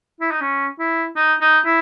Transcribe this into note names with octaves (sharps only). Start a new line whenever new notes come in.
E4
D#4
C#4
E4
D#4
D#4
E4